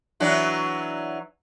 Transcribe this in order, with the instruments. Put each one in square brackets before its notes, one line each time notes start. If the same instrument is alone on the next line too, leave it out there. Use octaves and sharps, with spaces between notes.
[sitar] E3 F#3 D4